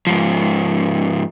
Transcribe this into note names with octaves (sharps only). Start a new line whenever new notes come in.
G#2 F3